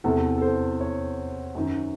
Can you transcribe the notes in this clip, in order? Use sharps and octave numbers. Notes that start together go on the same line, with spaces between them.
E2 C3 E3 A4
A4
C5
C#5
F#2 D#3